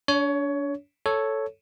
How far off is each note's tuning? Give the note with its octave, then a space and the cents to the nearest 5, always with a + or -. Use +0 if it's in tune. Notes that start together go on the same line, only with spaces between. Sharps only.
D4 -35 C#5 +20
A4 +0 C#5 +0